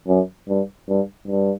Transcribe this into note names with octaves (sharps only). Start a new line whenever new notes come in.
F#2
G2
G2
G2